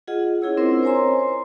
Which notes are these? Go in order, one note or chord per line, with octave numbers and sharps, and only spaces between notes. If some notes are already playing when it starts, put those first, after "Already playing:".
F4 G#4 D#5 F#5
C#4 E4 G#4 C#5 E6
C4 D4 A#4 C5 D#5
C5 C#5 G#5 A#5 C6
C5